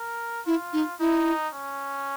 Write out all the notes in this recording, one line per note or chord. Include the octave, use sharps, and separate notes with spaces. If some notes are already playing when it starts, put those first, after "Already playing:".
Already playing: A#4
E4 F4
D#4
D#4 E4
C#4